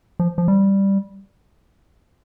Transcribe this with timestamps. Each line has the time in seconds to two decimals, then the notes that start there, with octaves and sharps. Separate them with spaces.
0.20 F3
0.38 F3
0.48 G3